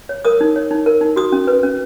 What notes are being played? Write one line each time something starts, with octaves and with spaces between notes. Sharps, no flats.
C#5
A#4 D#6
D#4
C#5
D#4
A#4
D#4
F#4 D#6
C#4
B4
C#4